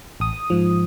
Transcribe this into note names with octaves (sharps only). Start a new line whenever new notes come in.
A1 D#6
G#2 F3